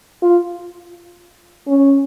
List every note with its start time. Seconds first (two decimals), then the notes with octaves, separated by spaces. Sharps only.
0.23 F4
1.68 C#4